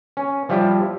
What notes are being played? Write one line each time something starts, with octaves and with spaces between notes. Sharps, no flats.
C#4
F3 G3 E4 F4 G4